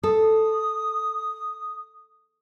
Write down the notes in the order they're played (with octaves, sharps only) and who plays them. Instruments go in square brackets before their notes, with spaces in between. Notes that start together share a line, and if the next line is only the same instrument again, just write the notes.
[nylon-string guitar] A4 [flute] D#6